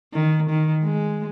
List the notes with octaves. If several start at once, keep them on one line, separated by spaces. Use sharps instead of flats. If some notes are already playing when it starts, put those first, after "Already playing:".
D#3
D#3
G#3